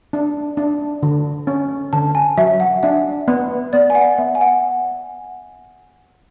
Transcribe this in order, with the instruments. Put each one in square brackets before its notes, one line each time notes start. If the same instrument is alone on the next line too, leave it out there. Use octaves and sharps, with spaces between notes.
[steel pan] D4
D4
D3
C#4
[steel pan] D3 [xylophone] A5
[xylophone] G#5
[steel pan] F#3 [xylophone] E5
[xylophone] F#5
[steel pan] D4 [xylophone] E5
[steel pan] B3
[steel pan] B3 [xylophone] D5
[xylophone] G#5
F#5
[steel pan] B3 [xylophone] E5
[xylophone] G#5
F#5